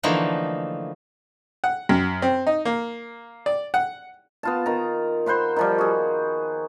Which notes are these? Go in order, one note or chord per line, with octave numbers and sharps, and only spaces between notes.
D3 E3 F3 A3 A#3 D#4
F#5
F#2
C4
D#4
A#3
D5
F#5
B3 F4 A5
D#3 A#5
C5 F#5 B5 C6
D#3 F3 G3
F#4 G#4